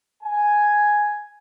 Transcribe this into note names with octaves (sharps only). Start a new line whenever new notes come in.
G#5